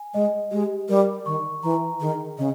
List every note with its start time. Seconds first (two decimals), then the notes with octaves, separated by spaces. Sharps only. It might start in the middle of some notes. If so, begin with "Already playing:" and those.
Already playing: G#5
0.14 G#3 D#5
0.51 G#3 G4
0.89 G3 A#4
1.26 D#3 C#6
1.63 E3 A#5
2.00 D#3 G#4
2.38 C#3 D#5